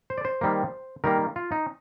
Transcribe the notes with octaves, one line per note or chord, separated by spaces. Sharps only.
C5
D5
C5
D#3 G3 A#3
D#3 G3 A#3 A#4
F4
D#4